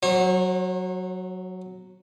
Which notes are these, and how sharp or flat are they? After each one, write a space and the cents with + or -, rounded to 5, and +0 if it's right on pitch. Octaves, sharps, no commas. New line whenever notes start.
F#3 +0 C#5 -45 C#6 -35